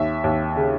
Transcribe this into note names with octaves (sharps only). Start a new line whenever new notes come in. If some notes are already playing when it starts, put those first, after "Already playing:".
Already playing: D#2 E5
D#2
C#3